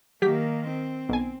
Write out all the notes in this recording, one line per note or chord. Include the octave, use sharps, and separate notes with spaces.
D#3 F#3 A#3 G4 B6
C4
B1 G#5